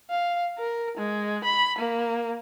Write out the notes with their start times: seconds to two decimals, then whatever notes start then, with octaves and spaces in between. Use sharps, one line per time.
0.11 F5
0.59 A#4
0.98 G#3
1.45 B5
1.79 A#3